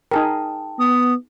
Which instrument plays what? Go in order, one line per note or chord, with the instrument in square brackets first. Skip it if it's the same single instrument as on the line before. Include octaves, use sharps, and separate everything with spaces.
[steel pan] D#4 G#4 A#4 [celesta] G5 A5
[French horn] B3 [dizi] D#6